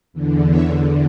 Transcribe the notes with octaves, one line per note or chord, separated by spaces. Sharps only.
E2 D3
C#5 E5